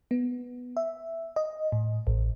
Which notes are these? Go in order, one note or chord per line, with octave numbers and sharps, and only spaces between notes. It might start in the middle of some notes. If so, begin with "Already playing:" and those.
B3
E5
D#5
A2
A1